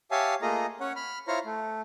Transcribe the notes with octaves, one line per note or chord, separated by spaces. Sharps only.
G4 C#5 E5 F5 G#5 A5
A3 A#3 F4 G#4 D#5 A#5
C#4 C#5 F#5
B5 F6
E4 F4 C5 C#5 A#5 F6
A3